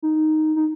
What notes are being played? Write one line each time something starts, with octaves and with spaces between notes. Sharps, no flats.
D#4
D#4